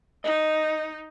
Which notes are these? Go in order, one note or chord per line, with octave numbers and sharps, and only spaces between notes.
D#4 D#5